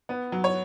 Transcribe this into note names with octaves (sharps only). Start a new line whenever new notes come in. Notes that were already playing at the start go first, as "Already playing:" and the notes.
B3
F#3
C#5